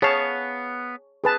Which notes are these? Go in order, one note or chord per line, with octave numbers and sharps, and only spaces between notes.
B3 G#4 C#5 F5 A5
G#4 B4 A5